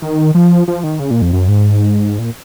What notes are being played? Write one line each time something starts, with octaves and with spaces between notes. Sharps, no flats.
D#3
F3
F3
D#3
C#3
A#2
F2
F#2
G#2
A#2